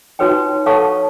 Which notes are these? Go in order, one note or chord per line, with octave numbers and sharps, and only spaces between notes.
D#4 F#4 B4 C#5 G5
A4 C#5 F5 F#5 A5 C#6